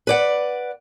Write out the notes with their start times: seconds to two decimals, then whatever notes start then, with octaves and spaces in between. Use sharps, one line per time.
0.07 B4 D5 F#5